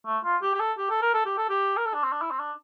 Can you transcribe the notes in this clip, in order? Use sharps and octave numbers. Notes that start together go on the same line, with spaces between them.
A3
F4
G4
G4
A4
G4
A4
A#4
A4
G4
A4
G4
A#4
A4
D4
C4
D4
E4
C4
D4